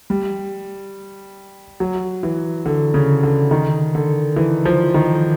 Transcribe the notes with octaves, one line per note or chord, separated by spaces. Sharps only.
G3
F#3
E3
D3
C#3
D3
D#3
D3
E3
F3
D#3